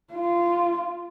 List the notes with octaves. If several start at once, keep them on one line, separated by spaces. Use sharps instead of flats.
F4